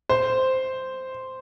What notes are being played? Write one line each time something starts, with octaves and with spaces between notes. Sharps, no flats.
C5